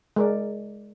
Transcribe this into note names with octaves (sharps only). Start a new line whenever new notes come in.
G#3 A#4 D5